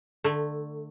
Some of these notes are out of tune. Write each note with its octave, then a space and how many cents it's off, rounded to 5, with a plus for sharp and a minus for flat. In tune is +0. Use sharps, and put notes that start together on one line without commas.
D3 +20 A3 +0